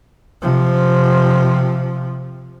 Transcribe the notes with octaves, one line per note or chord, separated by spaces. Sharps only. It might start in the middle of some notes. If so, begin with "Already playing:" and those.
C3 F3